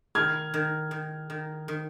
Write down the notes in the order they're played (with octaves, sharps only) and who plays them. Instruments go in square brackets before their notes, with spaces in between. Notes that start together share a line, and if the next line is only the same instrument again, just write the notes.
[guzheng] D#3 [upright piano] F6 G#6
[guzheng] D#3
D#3
D#3
D#3